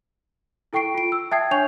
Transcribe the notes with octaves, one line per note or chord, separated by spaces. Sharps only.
E4 A4 G5 C#6 C7 D7
F4 D7
E6
E5 G5 A5 D#6 G#6 C7
D4 C#5 G#5 C#6 G6 F7